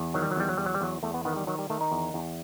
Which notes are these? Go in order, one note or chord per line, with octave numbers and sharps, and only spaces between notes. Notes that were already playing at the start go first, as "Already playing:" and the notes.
Already playing: E2
D#3 F#3
G3
F#3
E2 G3
F#3
E2 G3
F#3
G3
E2 F#3
E2 A3
B3
D#3 B3
G3
D#3 F#3
G3
D#3 A3
D#4
E2
E2